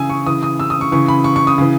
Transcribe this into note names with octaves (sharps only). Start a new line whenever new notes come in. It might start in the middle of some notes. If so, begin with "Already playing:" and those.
Already playing: C#3 E3 G#5 D#6 E6
C#6
C#3 E3 D#6
D#6
E6
D#6
C#6
C#3 E3 C#6
B5
C#6
C#6
D#6
C#3 E3